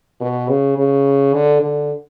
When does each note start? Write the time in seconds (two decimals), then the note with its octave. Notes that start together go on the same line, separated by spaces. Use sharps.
0.21 B2
0.49 C#3
0.78 C#3
1.34 D3
1.62 D3